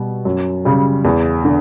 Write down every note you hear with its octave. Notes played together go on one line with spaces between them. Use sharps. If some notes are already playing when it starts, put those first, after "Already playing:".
Already playing: B2 G3
F#2
C#3 G3
E2
D3